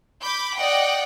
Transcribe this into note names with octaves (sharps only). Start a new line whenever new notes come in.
B5 D6 G6
D5 D#5 F#5 G5